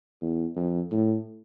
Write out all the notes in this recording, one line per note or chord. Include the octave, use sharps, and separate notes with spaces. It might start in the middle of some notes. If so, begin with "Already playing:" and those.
E2
F2
A2